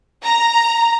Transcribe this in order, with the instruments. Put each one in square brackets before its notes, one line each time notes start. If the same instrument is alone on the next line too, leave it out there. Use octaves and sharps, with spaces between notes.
[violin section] A#5